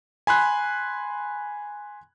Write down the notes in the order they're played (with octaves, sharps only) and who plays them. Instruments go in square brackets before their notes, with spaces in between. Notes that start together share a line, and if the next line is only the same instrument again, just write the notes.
[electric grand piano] G#5 B5 C6 F#6